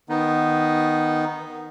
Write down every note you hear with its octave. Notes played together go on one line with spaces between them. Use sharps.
D#3 B3 D#4